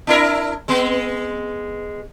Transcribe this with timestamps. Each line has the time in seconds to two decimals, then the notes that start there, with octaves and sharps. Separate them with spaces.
0.07 D4 E4 A#4
0.68 G#3 B3